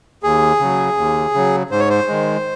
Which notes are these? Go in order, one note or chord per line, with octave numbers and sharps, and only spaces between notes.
D#2 G#4
C#3 F#3
D#2
C#3 F#3
G#2 C5
C#5
C5
D#3 G#3